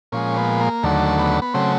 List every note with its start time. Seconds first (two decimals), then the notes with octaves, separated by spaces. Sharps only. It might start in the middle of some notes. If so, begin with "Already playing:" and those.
0.12 A#2 F3 G#3 C#4
0.37 B3
0.60 A#3
0.83 D#2 D3 F#3 A3
1.19 B3
1.42 B3
1.54 C#3 F#3 A3 C4